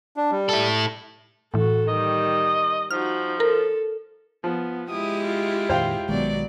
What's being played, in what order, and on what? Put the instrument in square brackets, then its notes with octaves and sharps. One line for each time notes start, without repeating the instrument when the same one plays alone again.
[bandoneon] D4
G3
[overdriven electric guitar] E4 A4
[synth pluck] A2 E3 [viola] F#4 A4
[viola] D#3 G3 [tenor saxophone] D#5
[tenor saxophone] F3 [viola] D#4 F#4 [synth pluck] F6
[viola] A4 [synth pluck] A#4
[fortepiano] F3 [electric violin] B3
[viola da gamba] G#3 E4 G4 [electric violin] D#6
[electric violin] F4
[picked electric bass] F2 A#2 D#3 [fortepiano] C5 F5 G5
[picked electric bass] B1 D#3 G#3 [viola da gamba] B2 F#3 D5